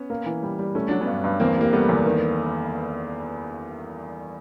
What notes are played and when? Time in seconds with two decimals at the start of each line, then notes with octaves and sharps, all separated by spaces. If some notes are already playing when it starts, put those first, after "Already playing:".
Already playing: B3 C#4
0.10 A#3
0.26 E3
0.43 G3
0.59 G3
0.75 A3 C#4
0.88 F#3 D4
1.01 B3 C#4
1.07 G2
1.24 G2
1.40 E2 A#3 C4
1.57 G3 A#3
1.73 G3 A3 B3
1.89 E2
2.06 D#3